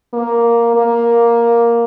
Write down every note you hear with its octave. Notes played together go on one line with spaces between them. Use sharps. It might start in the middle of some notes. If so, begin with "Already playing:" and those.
A#3
A#3